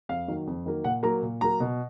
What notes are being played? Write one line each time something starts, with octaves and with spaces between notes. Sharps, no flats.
F2 F5
D#3 F#3 A#3
F2
D#3 F#3 A#3
A#2 F#5
F#3 A#3 A#5
A#2
F#3 A#3 A#5
B2